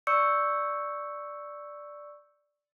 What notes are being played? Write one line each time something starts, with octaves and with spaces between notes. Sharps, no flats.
D5 C#6 E6 G6 C#7